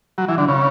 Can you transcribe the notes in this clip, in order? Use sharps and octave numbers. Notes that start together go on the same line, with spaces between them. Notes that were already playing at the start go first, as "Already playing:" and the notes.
F#3
E3
D3
C#3